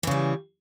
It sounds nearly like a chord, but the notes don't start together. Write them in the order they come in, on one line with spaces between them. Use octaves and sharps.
E3 C#3 G3